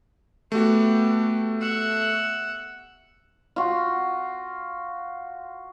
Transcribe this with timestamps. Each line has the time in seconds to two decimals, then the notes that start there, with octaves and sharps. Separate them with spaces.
0.52 A3 B3 F#4 G4
1.61 E5 F#5
3.56 F4 F#4